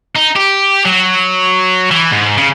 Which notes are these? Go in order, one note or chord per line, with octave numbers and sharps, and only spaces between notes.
D#4
G4
F#3
E3
G#2
C#3